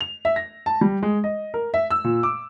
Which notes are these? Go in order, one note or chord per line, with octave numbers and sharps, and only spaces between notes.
F7
E5
A#6
A5
G3
G#3
D#5
A#4
E5
E6
A#2
D6